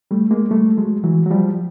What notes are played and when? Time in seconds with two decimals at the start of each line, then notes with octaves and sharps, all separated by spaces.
0.11 G3 A3
0.31 G#3 A#3
0.51 G3 A3
0.77 F#3 G#3
1.04 E3 F#3
1.26 F#3
1.31 F3 G3